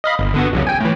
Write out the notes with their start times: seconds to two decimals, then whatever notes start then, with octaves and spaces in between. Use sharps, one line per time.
0.04 D#5 F5 B5
0.19 G1
0.34 D3 B3 F#4
0.53 C2 F#2 C#3
0.67 G5 G#5
0.81 A2 E3